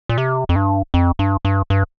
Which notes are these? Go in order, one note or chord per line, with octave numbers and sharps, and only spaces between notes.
A#2
C3
F2
G2
F2
G2
G2
G2